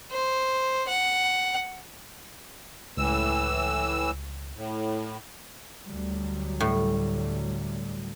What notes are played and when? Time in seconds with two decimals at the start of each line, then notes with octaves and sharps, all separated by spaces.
0.11 C5
0.88 F#5
2.97 C#2 A2 E3 E6
4.56 A2
5.84 D2 F#3 G3
6.60 A2